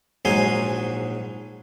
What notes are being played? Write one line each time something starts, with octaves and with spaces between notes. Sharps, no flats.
A#1 G#2 F#3 D#4 G#5 C6